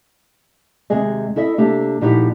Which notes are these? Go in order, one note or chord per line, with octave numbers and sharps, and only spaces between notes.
D#2 C3 G#3 G#4 D#5
E4 A4 D#5 E5
C3 A#3 D4 G4 A4
A#2 F3 D#4 E4 F#4 G4